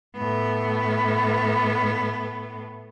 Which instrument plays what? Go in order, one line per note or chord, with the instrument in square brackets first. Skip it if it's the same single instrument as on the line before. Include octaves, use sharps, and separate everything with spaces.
[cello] A2 B3